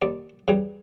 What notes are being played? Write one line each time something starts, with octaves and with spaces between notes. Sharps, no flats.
D#2 D5
C#3 E3 G3